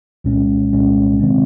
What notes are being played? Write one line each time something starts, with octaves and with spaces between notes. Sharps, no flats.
C2 A#2 G#3 C#4
C2 A#2 G#3 C#4
C3 D#3 G#3 C4